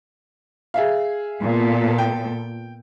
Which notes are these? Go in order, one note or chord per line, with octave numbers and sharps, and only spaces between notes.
G#4 E5 F5
A#2 B3 A4
G5